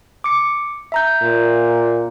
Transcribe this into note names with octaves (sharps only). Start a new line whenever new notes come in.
D6 C#7
E5 A#5 G6
A#2